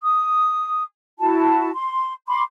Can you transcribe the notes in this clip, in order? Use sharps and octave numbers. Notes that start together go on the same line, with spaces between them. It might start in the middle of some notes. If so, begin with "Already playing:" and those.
D#6
E4 F#4 A5
C6
B5 C6 D6